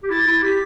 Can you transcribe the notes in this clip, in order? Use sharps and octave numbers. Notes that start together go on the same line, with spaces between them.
G4
E4 A6
E4
G4 B6